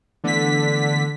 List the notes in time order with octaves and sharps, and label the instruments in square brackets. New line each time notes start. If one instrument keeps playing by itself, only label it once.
[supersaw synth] D3 B6 [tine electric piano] E3 A3 B3